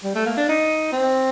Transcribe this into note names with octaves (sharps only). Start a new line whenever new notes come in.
G3
A3
A#3
D4
D#4
C4